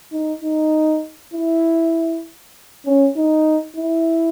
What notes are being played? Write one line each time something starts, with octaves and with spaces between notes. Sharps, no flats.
D#4
D#4
E4
C#4
D#4
E4